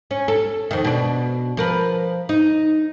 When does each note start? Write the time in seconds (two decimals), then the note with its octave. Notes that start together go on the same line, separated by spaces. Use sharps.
0.11 C#4
0.28 A4
0.71 F2 D#3
0.85 B2 D4
1.57 F3 A#4 B4
2.29 D#4